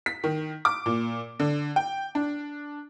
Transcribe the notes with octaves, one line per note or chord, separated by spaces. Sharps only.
B6
D#3
D6
A#2
D3
G5
D4